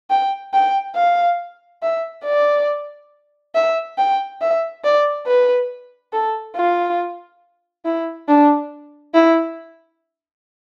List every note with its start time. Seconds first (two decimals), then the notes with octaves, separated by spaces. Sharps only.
0.10 G5
0.53 G5
0.96 F5
1.82 E5
2.24 D5
3.55 E5
3.98 G5
4.41 E5
4.84 D5
5.26 B4
6.13 A4
6.56 F4
7.85 E4
8.28 D4
9.14 E4